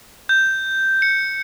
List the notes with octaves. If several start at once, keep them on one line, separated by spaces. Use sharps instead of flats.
G6
C#7